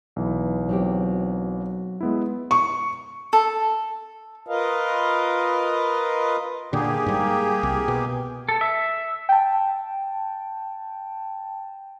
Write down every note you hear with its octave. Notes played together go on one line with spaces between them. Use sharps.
B1 E3
F#3 C4 G4
G#3 B3 E4
C#6
A4
F4 A#4 B4 D#5 F5
A#2 D3 A#3 G4 G#4
G#2 G3
C2
B2
A4
E5
G5 A5